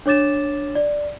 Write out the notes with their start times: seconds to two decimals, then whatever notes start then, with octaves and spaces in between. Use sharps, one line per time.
0.06 D4 C#5 D6 A6 E7
0.75 D5